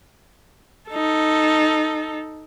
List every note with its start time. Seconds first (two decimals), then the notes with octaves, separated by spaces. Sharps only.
0.90 D#4 A4